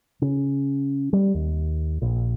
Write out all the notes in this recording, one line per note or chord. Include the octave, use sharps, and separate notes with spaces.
C#3
G3
D#2
A#1